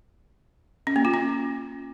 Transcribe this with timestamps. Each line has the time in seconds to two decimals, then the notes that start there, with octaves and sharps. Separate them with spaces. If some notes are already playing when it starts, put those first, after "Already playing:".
0.87 C#4
0.96 A#3
1.05 F4
1.14 C#4